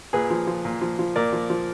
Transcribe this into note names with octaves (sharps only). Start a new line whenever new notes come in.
A#2 G#4 B4
F3
F3
A#2
F3
F3
A#2 A#4 D5
F3
F3